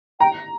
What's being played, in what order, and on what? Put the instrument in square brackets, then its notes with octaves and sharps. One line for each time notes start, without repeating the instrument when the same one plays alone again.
[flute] G5 [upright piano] A#5